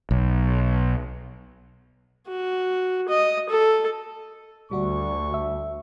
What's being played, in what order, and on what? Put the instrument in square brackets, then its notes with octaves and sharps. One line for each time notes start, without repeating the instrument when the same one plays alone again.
[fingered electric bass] B1
[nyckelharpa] F#4
D#5
A4
[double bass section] D2 [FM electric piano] G3 F#4 D5 [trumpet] C#6
[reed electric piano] E5